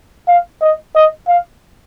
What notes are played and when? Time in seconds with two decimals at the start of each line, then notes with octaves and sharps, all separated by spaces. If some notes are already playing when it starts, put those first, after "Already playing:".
0.28 F5
0.61 D#5
0.95 D#5
1.28 F5